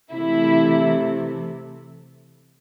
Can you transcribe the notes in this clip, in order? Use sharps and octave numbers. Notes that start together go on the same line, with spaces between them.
C3 E3 A3 E4